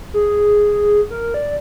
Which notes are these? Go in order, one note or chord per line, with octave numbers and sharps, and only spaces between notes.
G#4
A#4
D5